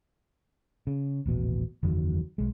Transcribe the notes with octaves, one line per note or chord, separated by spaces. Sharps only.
C#3
D#1 A1 B2
F#1 E2 D#3 F#3
B1 G#3